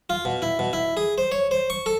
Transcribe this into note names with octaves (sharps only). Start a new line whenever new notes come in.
F4
B2
E4
B2
E4
G#4
C5
C#5
C5
C#6
A4